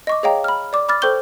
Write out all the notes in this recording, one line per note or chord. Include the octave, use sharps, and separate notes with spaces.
D#5 C#6 D6
G#4 C#5 D#5 F5 G5 A#5
B5 F6
D5 D6
B5 D6 F6 A6
A4 C5 G5 C#6 G6 G7